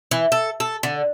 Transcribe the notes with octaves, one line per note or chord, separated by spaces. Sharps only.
E3
A4
A4
D3